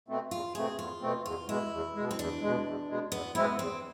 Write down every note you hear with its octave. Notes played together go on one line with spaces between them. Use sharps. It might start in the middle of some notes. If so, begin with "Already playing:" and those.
B2 A3 C4
E2 F4
B2 A3 C4 G#4
E2 F4
B2 A3 C4
E2 F4
B2 G#3 E4
E2
B2 G#3
C4
E2 D4
B2 G#3
E2
B2 G#3
E2 B3
B2 G#3 B3 C4 E4
E2 C4